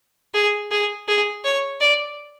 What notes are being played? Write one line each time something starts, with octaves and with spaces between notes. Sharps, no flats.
G#4
G#4
G#4
C#5
D5